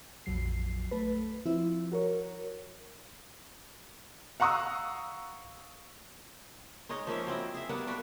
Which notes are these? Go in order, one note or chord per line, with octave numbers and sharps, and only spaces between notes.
A#1 F2 F#3 C7
A3 A4 B4
F3 C4 E4
F#4 A#4 C#5
F5 F#5 A#5 C#6 D#6 E6
G#3 D#4 C#5 D#5
F3 A#3 C#4 E5
F#3 C4 E4 D#5
G#4 E5
G3 A#3 B3 F#5
D4 F#4 B4 D5